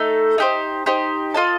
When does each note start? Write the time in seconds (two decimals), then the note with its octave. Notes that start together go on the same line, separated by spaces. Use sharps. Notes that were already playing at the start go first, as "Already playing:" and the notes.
Already playing: A3 D#4 A4
0.38 D#4 G4 C5
0.86 D#4 G4 C5
1.34 F4 A4 D#5 A5